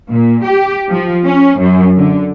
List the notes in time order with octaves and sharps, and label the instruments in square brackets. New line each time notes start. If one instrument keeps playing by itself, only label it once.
[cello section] A#2
G4
F3
C#4
F#2
D3